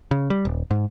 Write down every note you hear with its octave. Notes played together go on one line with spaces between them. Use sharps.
C#3
G3
D#1
G#2